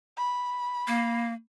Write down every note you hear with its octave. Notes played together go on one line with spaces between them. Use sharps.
B5
A#3